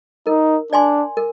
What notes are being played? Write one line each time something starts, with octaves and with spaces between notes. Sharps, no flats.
D#4 A#4
D4 D5 G#5 C6
A#4